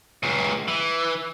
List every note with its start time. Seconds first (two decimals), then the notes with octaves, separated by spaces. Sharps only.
0.23 C#2 A#2
0.68 E3